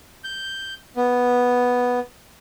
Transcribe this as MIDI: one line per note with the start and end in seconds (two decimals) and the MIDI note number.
0.24 0.74 91
0.96 1.99 59